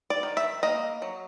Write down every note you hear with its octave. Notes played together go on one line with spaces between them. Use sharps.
D5
D#3
E5
A#3 D#5
F#3